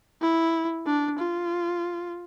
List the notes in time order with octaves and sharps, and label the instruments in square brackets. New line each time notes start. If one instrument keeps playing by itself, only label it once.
[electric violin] E4
D4
F4